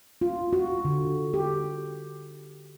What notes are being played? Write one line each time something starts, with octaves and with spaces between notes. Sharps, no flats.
F4
F#4
D3
G4